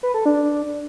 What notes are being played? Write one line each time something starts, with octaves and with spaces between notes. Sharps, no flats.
B4
A4
D4